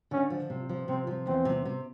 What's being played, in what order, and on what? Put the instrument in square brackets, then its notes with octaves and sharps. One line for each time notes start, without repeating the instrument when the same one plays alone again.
[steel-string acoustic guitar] D3 [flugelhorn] C#4
[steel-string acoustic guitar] F3
C3
F3
[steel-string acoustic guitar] C3 [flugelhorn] C4
[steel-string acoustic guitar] F3
[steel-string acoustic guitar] E2 [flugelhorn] C4
[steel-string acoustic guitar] C3
C3